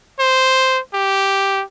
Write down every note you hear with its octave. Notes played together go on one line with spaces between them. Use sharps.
C5
G4